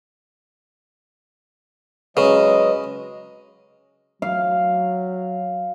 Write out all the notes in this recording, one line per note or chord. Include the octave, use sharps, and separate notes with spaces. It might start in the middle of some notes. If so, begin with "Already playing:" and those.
C#3 F#3 G#3 B4 D#5
F#3 F5